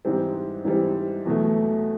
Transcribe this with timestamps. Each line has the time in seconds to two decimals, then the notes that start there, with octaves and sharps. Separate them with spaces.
0.05 G#2 E3 G3 C4
0.65 G#2 E3 G3 C4
1.25 E2 B2 F#3 A3